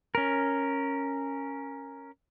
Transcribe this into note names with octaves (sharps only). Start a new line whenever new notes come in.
C#4 A#4